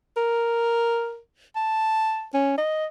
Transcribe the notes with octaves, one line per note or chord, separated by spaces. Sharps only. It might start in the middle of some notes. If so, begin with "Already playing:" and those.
A#4
A5
C#4
D#5